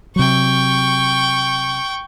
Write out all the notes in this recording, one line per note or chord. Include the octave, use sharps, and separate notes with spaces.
C3 F#3 G5 C#6